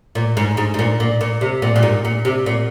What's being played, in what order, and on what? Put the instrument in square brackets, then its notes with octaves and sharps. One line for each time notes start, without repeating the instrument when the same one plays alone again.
[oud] A#2
G#2
G#2
G#2
A#2
A#2
A#2
C3
A#2
A#2
G#2
A#2
C3
A#2